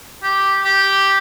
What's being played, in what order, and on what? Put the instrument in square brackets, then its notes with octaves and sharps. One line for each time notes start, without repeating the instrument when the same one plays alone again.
[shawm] G4
G4